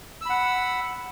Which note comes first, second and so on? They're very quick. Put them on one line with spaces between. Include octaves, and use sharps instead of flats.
E6 B5 F#5